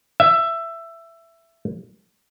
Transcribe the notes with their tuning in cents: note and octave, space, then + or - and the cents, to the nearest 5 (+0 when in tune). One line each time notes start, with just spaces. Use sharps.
E5 +15